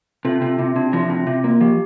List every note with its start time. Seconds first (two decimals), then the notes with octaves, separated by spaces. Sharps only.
0.25 C3 F4 A4
0.36 F4
0.42 C3
0.47 F4
0.59 C3 E4
0.76 C3 D4
0.93 F3 E4
1.09 C3 E4
1.27 C3 F4
1.44 A#3
1.61 F3 G4